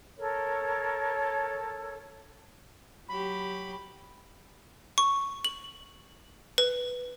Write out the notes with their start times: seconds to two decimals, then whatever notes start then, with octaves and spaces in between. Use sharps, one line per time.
0.17 A4 A#4 C#5
3.09 F#3 G4 B5
4.98 C#6
5.45 F#7
6.58 B4